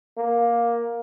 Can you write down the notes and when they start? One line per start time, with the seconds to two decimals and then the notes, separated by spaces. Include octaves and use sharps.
0.18 A#3